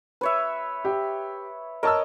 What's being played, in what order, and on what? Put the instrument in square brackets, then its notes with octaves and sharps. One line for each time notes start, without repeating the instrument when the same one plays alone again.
[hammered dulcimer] B4 C#5 E5
[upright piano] G4
[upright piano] A#4 A5 E6 [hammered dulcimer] C#5 D#5